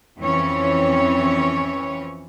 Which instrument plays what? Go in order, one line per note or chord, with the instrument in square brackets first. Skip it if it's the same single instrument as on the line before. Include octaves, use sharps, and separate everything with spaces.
[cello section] F2 E3 C4 C#4 C#5